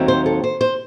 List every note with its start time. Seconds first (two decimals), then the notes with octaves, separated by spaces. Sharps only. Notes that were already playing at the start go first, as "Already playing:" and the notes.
Already playing: D#2 D#3 F#3 A3 C4
0.08 C5
0.26 A4
0.44 C5
0.61 C5